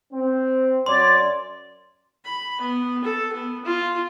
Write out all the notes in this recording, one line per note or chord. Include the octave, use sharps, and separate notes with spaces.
C4
F#2 C#5 D5 C6 D6
B5
B3
A4
B3
F4